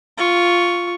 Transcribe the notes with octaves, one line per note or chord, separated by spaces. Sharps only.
F4 C#6